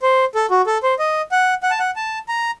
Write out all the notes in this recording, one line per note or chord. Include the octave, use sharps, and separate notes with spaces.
C5
A4
F#4
A4
C5
D#5
F#5
F#5
A5
F#5
A5
A#5